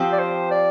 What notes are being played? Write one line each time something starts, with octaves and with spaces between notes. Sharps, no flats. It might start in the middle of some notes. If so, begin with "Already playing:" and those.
Already playing: F3 C4 G4
D5
C5
D5